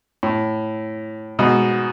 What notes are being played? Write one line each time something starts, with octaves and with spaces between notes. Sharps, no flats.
A2
G#2 B2